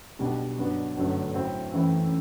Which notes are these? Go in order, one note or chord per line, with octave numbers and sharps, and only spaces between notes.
B1 B2 G3 D4
G2 F#3 B3 D4
G1 F#2 F#3 A3 D4
A2 F#3 C4 E4
F#2 E3 A3 C4 E4